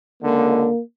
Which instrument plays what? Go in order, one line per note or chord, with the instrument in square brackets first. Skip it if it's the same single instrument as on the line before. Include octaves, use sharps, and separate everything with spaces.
[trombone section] C#2 D3 [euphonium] A#3